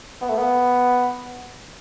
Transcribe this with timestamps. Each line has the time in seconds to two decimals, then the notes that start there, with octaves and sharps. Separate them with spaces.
0.21 B3
0.29 A3
0.38 B3